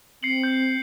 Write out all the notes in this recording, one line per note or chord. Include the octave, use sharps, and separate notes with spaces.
C4 C7 C#7 F#7
G6